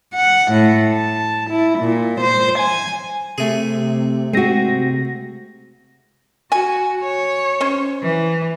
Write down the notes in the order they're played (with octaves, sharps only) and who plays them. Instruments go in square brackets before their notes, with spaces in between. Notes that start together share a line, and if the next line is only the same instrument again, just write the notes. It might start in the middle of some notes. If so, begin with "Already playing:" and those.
[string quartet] F#5
A2
A5
E4
A#2
C5
G#5
[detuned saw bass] C3 [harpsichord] A3 G#4
[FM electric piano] G#3 A#6 [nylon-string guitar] C4 F#4
[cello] F#4 [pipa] G#5
[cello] C#5
[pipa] C#4 C5
[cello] E3